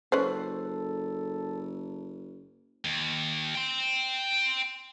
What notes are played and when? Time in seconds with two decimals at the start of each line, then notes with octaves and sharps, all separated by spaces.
0.12 F#1 C#4 A4 B4 C5
2.85 D#2
3.55 G5 C6